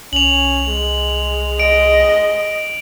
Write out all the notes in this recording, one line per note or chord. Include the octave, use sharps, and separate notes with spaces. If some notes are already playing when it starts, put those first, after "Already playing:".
C2 C#4 F7 F#7
G#3
D#5 D7